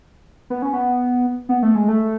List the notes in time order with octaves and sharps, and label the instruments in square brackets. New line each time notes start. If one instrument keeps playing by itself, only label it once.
[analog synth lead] B3
C#4
B3
B3
A3
G#3
A3